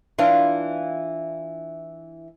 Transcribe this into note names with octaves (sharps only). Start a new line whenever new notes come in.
E3 D4 F4